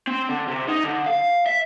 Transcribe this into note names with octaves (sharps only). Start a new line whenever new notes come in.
C4
D3
C3
D#4
D3
F5
E5